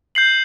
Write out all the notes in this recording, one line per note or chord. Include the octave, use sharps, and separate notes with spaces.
G6 C7 F#7